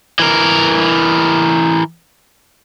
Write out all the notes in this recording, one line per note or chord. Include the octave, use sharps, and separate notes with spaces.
E3 A#4